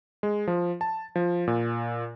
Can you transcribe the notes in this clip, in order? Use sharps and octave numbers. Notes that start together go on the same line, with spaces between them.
G#3
F3
A5
F3
A#2